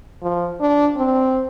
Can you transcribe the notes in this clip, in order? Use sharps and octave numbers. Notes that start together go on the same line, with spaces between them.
F3
D4
C4